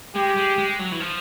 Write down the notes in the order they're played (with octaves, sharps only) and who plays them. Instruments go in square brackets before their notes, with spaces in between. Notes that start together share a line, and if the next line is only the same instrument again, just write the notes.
[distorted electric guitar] G#3 [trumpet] G4
[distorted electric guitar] G#3
G#3
F#3
E3
F3